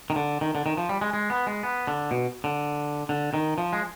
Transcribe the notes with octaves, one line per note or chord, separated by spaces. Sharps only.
D#3
D3
D#3
D3
D#3
F3
G3
G#3
G#3
B3
G#3
B3
D3
B2
D3
D3
D#3
F3
G#3